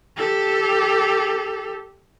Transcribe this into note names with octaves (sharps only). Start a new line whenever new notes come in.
G4 A4